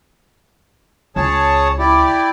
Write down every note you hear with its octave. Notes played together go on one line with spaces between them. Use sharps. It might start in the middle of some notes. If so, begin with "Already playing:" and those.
C#2 G#4 C#5 A5
E4 G4 D5